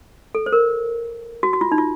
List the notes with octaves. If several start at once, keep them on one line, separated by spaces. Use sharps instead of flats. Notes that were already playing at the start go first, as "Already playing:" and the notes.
A4
C5
A#4
F#4
F#4
F4
D#4
F4